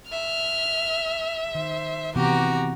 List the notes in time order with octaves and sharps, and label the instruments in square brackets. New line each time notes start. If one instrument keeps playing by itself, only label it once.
[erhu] E5 [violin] F6
[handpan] D#3 [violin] C5
[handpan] C3 E3 B3 [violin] F#4 A#5 [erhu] G4